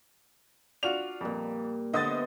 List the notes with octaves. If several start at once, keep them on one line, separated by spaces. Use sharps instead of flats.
D4 F4 F#4 F7
F2 A#2 G3
D3 B3 C5 D#5 E5 D#6 A6